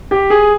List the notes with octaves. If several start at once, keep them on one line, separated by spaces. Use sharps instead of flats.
G4
G#4